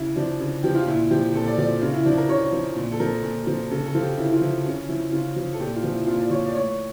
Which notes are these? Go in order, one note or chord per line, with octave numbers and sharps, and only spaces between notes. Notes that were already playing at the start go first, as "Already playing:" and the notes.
Already playing: C#3 E4
F3 D4
C#3
F3 G4
F4
A#2 E4
F3 G4
A#2 A4
D5
F3 D5
C#3 F4
E4
F3 D4
A#4
C#3 C#5
F3
A#2
A4
F3 A#4
A#2
F3
C#3 A4
A4
F3 F4
G4
C#3 E4
F4
F3 E4
C#3 C#4
F3 E4
C#3 F4
F3
A4
A#2 G4
F4
F3
E4
A#2 F4
D5
F3 C#5
D5
A2 C#5